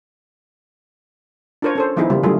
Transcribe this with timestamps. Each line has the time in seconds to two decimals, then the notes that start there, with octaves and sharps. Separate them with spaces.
1.62 D4 F4 A#4 C5 C#5
1.75 C#4 A4 C5
1.96 D#3 F3 B3 D#4 E4 G#4
2.10 C#3 G3 A#3 F4
2.23 D3 F#3 G3 A3 F4 G#4